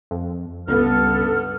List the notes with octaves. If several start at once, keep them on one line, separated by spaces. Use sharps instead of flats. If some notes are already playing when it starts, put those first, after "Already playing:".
F2
C#2 G2 B3 A4 F6